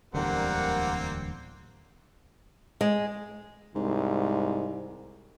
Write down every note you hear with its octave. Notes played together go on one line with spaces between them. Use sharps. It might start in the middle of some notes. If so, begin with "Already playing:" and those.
D1 E2 D3 G3 A#3 C4 A#4 F#5
G#3
C2 G#2